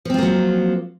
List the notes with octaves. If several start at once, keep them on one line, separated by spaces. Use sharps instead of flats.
F3 F#3 A#3 C4 F4